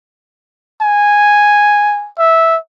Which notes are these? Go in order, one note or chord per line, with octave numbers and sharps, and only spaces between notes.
G#5
E5